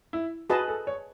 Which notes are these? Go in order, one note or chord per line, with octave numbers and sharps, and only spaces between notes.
E4
F#4 G#4 B4 D#5 A5
A4
C#5